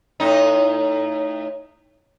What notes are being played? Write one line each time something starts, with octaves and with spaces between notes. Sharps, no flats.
A2 D#4